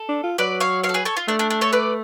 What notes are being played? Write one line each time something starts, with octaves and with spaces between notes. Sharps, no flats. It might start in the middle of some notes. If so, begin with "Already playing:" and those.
Already playing: A4
D4
F4
F#3 B4 D5
C#5 F5
C#5 F5
A4
G#4 B4
A4 C#5
F4
A3 D4
D4
D4
A4 C#5
B4 D5